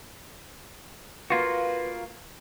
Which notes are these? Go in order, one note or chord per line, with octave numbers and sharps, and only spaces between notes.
A#3 F4 F#4 B4